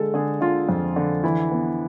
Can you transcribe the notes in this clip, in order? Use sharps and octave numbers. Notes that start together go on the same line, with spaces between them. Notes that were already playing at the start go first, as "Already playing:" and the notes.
Already playing: D3 G#3 A4
D3 G#4
D3 F4
F2
D3
E3 E4
B3